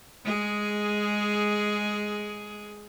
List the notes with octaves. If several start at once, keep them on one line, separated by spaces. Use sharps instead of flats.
G#3 G#4